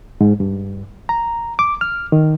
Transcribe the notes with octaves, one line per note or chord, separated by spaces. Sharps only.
G#2
G2
A#5
D6
F6
D#3